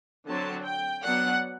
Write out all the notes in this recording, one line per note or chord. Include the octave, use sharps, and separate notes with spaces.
D3 F#3 C4 A5
G5
F#3 B3 D4 F#5